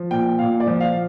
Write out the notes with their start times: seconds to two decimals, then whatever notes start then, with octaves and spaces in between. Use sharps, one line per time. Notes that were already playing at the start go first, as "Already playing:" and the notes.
Already playing: F3
0.11 A#2 G5
0.39 A#2 F5
0.60 D5
0.67 F3
0.80 F5